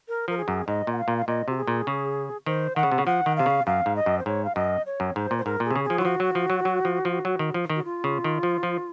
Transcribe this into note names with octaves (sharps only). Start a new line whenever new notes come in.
A#4
F3 A#4
G#4
F#2
G#2 D#5
A#2
F#5
F5
A#2
F5
A#2 D#5
C3 F#4
G#4
A#2
C#3
D#3 C5
D#3 F#5
C#3
C3
C#3
F3 F#5
D#3
C3 F5
C#3
F#2 F5
G#2
D#5
F#2
C5
G#2 C#5
F5
F#2 D#5
C#5
F#2
G#2 C5
A#2
C5
G#2 A#4
A#2 G#4
C3
C#3
G#4
F3
F#3 F4
F3 F#4
F#3
F3
F#3
F#3
F3
F3
F#3
D#3
F3
D#3
F#4
F4
C#3
D#3
F3
F3